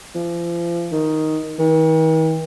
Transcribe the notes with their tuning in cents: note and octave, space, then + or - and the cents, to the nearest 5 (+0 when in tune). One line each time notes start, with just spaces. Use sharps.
F3 -35
D#3 +5
D#3 +45